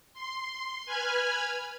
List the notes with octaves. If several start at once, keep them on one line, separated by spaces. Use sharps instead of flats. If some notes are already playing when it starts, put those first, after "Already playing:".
C6
B4 G#5 B5 F6 G#6